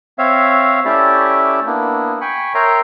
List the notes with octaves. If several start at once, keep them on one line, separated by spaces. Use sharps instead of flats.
C4 C#5 E5 F5
A3 C#4 E4 G4 D5 E5
A#3 B3 D4 E4
G5 G#5 B5 C#6
A#4 C#5 E5 G5 A#5 C6